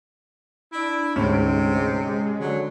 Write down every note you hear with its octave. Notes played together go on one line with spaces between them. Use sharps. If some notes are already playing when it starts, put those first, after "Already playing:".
D4 E4 D7
D2 G#2 C3 G#3 C#4 D7
D3 F#3